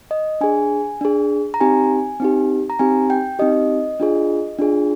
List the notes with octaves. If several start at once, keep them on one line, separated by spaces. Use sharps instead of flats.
D#5
D4 G#4 G#5
D4 G#4
A#5
C4 D#4 G4 G#5
C4 D#4 G4
A#5
C4 D#4 G4 G#5
G5
C4 D#4 G4 D#5
D4 F4 G#4
D4 F4 G#4